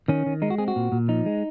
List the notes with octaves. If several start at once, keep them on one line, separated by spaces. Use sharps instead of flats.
D#3 C#4
D#3
G#3 D#4
F#4
C4 G#4
F#4
A#2
A#2
F3 D#4
G#3